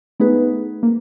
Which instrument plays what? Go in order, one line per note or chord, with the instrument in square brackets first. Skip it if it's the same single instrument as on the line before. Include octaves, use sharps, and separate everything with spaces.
[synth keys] A3 [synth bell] B3 D#4 G#4 B4
[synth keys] A#3